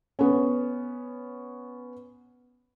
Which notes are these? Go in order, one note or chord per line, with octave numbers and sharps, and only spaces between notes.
B3 C#4